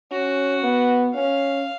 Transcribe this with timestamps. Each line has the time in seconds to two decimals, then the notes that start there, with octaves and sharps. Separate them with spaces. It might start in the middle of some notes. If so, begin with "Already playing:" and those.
0.11 C#4 F#4
0.63 B3
1.15 C#4 F5